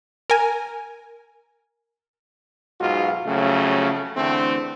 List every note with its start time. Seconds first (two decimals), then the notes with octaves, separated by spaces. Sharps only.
0.30 A#4 G#5
2.81 B1 G#2 F4 F#4
3.26 F2 C#3 F#3 A3
4.16 E2 D3 A3 C4